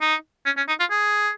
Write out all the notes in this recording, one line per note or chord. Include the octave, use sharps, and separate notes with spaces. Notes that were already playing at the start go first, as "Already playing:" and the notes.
D#4
C#4
C#4
D#4
F4
G#4